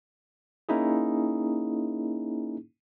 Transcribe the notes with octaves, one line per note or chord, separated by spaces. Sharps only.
A#3 C#4 D#4 E4 G#4